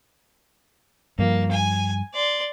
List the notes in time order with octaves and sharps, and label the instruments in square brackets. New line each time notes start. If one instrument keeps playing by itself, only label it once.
[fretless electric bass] G2 F3 [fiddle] A#3
[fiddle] G#5
D5 C6